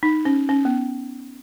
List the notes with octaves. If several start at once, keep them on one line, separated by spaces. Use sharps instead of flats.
D#4
C#4
C#4
B3